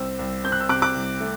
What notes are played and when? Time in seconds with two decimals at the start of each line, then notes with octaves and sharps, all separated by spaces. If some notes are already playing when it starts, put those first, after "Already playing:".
Already playing: C2 C4 E6
0.19 C2
0.44 C4 G6
0.52 F#6
0.61 E6
0.69 C3 D6 F#6
0.82 D6 F#6
0.94 C2
1.20 A3